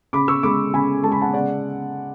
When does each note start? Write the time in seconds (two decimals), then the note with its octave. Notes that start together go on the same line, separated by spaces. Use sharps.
0.13 C#3 B5 D6
0.28 C#6 E6
0.43 G#3 B5 D6
0.73 C#3 G#5 B5
1.04 G#3 A5
1.12 B5
1.22 F#5 A5
1.33 C#3 D5 F#5